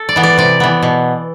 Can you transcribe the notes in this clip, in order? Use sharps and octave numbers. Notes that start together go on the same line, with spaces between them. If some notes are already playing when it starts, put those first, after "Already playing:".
Already playing: A4
D5
E3 B3
D5
C3 D5
E3 B3
B2